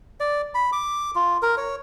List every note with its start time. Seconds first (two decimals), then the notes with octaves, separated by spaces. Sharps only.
0.20 D5
0.55 B5
0.72 D6
1.15 F4
1.42 A#4
1.57 C#5